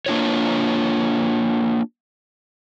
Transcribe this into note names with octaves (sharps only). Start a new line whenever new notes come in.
A#3 D4 F4 C#5